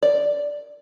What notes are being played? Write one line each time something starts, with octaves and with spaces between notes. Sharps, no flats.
D5